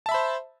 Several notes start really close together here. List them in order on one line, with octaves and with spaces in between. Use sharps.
A5 E5 B5 C5